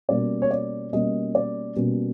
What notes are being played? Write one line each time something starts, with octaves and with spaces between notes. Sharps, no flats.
B2 G3 A#3 C#4 D5
C#5
D5
B2 G3 A#3 C#4 D#5
D5
B2 G3 A#3 C#4